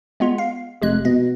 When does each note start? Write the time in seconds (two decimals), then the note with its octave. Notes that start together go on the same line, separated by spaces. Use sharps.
0.20 G#3 B3 F4
0.38 F5
0.82 F1 C3 G#3 F#6
1.05 B2 D#5